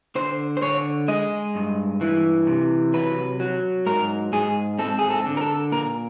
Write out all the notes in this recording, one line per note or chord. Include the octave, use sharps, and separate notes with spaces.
D3 C5
C5
D3 C#5
G#3 D#5
G2
E3
C3
F#3 B4
F#3
G#2 A#4
G#2 G#4
C4 A4
G#4
A4
D3
A#4
A4
A#2 A#4